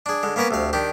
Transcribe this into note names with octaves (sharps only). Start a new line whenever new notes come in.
D4 G#4
D3 G#3
A#3 B3 C#4 A#4 B4
D2 C3 F5
D#3 D4 G4